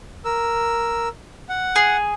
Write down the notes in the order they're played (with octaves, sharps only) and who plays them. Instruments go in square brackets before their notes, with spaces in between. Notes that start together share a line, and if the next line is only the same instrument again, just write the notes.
[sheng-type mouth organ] A#4 E6
F#5
[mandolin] G#4